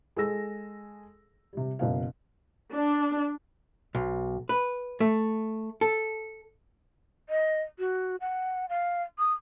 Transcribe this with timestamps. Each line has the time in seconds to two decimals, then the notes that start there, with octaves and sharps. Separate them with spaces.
0.16 G#3 G#4 A4 E6 A#6
1.53 C3 G3
1.79 F#1 B2 F5
2.74 D4
3.95 B1
4.49 B4
5.00 A3
5.81 A4
7.29 D#5
7.79 F#4
8.21 F#5
8.69 F5
9.19 D#6